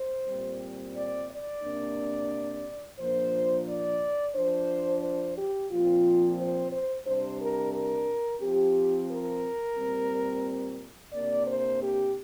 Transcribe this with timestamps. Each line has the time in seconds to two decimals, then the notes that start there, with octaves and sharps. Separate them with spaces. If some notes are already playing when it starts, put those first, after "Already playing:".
Already playing: C5
0.27 A#2 G3 C4
0.95 D5
1.30 D5
1.63 C3 A#3 D4
2.98 A#2 F3 A#3 D4 C5
3.67 D5
4.35 F3 D4 C5
5.03 C5
5.36 G4
5.70 A#2 F3 C4 F4
6.38 C5
6.71 C5
7.05 C3 G3 D4 C5
7.40 A#4
7.73 A#4
8.41 F3 C4 G4
9.10 A#4
9.77 A#2 G3 C4
11.13 C3 A#3 D4 D5
11.47 C5
11.81 G4